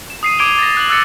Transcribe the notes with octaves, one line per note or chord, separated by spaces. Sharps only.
E7
D#6 C7 D#7
D6 G#6 D7 D#7 F7 G7
A6 A#6
F#6 F#7
E6 F#6 A6 C#7